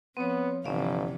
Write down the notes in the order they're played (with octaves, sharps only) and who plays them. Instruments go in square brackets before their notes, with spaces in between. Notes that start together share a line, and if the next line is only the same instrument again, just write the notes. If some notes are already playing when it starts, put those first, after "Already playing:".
[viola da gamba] F3 [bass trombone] B3 [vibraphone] C4 C#5
[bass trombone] G1 [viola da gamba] C3 E3 F3 [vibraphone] C#4 D5 F5